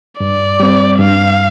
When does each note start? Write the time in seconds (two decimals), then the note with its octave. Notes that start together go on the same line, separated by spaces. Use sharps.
0.20 G2 D5
0.60 G3 C4
0.99 G2 F5